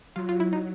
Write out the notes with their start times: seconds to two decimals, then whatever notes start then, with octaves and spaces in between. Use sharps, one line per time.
0.16 F#3 F4
0.29 F4
0.40 E4
0.53 D#4